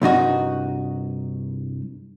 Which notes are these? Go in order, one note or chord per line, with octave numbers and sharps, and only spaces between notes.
C2 G2 D#4 F#4